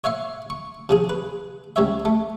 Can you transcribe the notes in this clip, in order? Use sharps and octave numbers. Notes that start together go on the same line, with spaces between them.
C#5 E5 F5 C#6
C#6
C3 F3 G#4
B4
C#2 G3 C#5 E5
A3